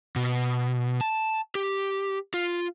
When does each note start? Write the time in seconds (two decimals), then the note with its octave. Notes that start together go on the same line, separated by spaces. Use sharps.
0.16 B2
1.01 A5
1.55 G4
2.34 F4